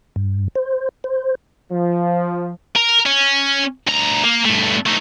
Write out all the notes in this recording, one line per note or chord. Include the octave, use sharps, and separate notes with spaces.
G2
C5
C5
F3
A#4
C#4
D2 A#5
A#3
G2 A3
A3 D#4